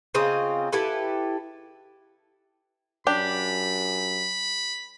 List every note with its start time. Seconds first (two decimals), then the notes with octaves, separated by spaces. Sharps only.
0.15 C#3 C4 F4 D#5
0.72 E4 G4 A4 B4
3.07 F#2 D4 G4 B5